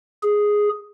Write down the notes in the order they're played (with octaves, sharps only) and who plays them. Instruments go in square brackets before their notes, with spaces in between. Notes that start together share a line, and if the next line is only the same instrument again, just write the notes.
[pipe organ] G#4